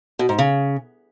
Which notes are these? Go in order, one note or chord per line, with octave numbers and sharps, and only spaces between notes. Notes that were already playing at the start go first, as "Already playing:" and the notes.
B2
G#2
C#3